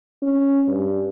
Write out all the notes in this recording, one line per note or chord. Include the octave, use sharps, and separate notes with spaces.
C#4
G2